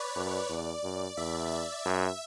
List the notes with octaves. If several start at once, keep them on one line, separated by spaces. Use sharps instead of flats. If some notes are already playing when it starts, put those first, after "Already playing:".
Already playing: B4 C#5 D5
F#2
E2
F#2
E2 E5
E5
F#2 E5